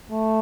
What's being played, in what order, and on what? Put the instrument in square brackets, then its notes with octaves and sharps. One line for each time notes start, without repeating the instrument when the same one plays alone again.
[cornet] A3